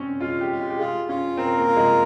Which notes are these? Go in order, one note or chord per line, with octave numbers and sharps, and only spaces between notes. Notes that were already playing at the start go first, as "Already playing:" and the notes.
Already playing: C4 C#4
G#3 F4
G4
G#3
F4
G4
F4 G#4
C#4 F4
C4 A#4
A#3
F4
G#3